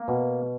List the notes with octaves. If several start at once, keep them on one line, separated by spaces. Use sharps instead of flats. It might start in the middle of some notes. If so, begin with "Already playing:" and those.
Already playing: A#3
B2